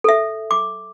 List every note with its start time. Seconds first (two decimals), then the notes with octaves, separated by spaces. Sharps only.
0.04 A4 E5
0.51 D6